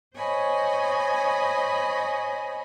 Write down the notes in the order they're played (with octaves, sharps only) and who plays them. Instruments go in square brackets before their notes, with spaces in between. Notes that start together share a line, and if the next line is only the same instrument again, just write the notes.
[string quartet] C5 C#5 D#5 G#5 B5